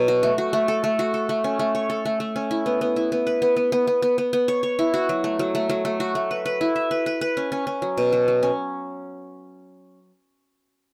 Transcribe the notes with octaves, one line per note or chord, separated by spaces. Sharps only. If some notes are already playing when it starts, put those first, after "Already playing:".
Already playing: B2 F#3
F#4
A3
F#4
A3
A4
A3
F#4
A4
A3
C#4
A3
C#5
A4
A3
A3
C#4
E4
B3
B3
E4
B3
B4
B3
B3
B3
B3
B3
B3
B3
C#5
C#5
E4
F#4
F#3
A3
F#3
A3
F#3
A3
F#4
A3
B4
B4
E4
E5
B4
B4
B4
C#4
C#4
C#4
F#3
B2
F#3
F#3
C#4